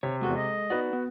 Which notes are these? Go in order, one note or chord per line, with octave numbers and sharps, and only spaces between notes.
C3 C#5
E2 G#3 F#4 G#4 A4
D#5
B3 D#4 F#4 B4 D5
B3